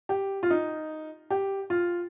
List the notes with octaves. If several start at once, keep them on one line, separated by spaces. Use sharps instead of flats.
G4
F4
D#4
G4
F4